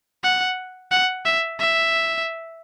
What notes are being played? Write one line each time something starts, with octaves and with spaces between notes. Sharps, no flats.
F#5
F#5
E5
E5